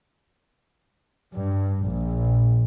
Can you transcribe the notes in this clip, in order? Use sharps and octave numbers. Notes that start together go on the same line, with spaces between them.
G2
A#1